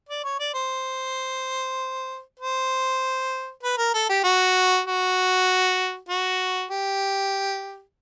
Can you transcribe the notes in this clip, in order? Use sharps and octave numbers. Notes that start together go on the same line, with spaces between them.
D5
C#5
D5
C5
C5
B4
A#4
A4
G4
F#4
F#4
F#4
G4